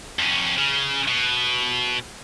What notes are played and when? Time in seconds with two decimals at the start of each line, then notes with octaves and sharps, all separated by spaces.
0.19 F2 C#4
0.58 C#3
1.08 B2